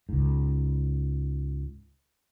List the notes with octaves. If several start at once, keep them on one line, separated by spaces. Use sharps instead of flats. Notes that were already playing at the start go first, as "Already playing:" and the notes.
C#2 G#2